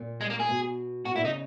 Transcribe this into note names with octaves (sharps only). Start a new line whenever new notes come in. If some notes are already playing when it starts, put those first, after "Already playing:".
Already playing: A#2
G#3
A#3
G#4
B2
B2 F#4
A#2 E4
C#3 D#4